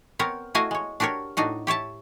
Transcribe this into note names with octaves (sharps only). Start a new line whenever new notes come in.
B3 C4 A#4 C#5
A3 E4 F#4 D#5 F5 G#5
G#3 C#5
D4 F#4 G4 A#4 C#5
A2 D4 D#4 F#4
G4 C#5 E5 A5